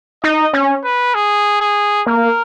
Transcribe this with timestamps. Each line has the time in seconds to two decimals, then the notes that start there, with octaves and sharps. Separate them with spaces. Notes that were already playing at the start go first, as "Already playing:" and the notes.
0.24 D#4 D#5
0.53 C#4
0.84 B4
1.15 G#4
1.61 G#4
2.06 A#3 A#4